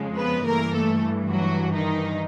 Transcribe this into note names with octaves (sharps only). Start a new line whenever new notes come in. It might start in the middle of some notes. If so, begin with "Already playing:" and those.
Already playing: F2 C#3 F3 G#3
B3 B4
G2 E3 A3 A#3 A#4
A3 A4
F#3 F#4
D#3 D#4